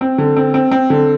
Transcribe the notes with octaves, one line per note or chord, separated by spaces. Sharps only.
C4
D3
C4
C4
C4
D3